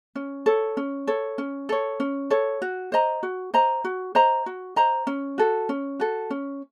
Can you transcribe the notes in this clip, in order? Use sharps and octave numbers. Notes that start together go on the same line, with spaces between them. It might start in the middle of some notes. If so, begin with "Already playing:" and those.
C#4
A4 C#5
C#4
A4 C#5
C#4
A4 C#5
C#4
A4 C#5
F#4
C5 D#5 A#5
F#4
C5 D#5 A#5
F#4
C5 D#5 A#5
F#4
C5 D#5 A#5
C#4
F#4 A4
C#4
F#4 A4
C#4